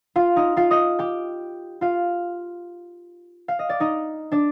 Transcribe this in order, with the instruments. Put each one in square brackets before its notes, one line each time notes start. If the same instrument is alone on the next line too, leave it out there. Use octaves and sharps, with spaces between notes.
[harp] F4 F5
D#4 D#5
F4 F5
D#5 D#6
G4 G5
F4 F5
F5
D#5
D5
D#4 D#5
D4 D5